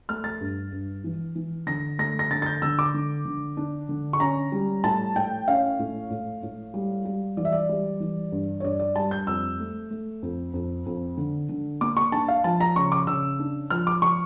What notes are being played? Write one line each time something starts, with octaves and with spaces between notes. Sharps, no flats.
A3 F6
A6
G2
G2
E3
E3
D3 A#6
A3 A#6
A#6
D3 A6
A6
G6
D3 E6
D6
D3
D3
D4
D3
C#6
C#4 A#5
G3
A2 A5
A2 G5
C#4 F5
A2
A2
A2
G3
G3
E3 D5
E5
D5
G3
E3
G2
C#5
G2 D5
D5
G3 A5
G6
F2 E6
A3
A3
F2
F2
F2
D3
D3
A#3 D6
C#6
D4 A5
F5
F3 A5
A#5
C#3 C#6
D6
C#3 E6
D4
F3 F6
D6
F3 C#6